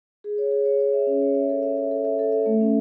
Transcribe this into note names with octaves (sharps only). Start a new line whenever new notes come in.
G#4
C#5
G#4
C#5
C#5
E5
C#4
C#5
E5
A4
E5
E5
A4
E5
A4
E5
A3
C#4